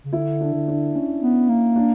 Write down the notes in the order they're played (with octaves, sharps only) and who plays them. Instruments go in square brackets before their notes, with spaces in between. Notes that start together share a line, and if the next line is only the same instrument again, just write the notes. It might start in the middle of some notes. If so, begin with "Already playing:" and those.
[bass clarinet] C#3
[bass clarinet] D3 [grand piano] E4
[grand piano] D4
[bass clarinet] D3
[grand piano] D4
C#4
[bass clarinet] B3
A#3
[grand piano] D4